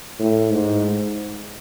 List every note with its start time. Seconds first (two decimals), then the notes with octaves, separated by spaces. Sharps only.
0.20 A2
0.52 G#2